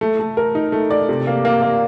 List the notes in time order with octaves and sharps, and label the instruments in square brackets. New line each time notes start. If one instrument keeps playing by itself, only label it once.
[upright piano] A3
A3
A#4
D#4
A3
D5
C3
A#3
A#3
A#3